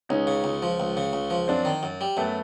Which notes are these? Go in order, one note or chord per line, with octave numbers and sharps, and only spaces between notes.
C#2 C#4 D#4
C#3
C#2
F3
C#2
C#3
C#2
F3
F#2 C4 D4
D#3
F#2
G3
F#2 A3 B3